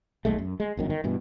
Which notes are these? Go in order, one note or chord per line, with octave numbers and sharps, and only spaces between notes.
D#1 B1 G#3 A3
F#2
G#3
G1 F#2 D#3
D#3
G2 B2 E3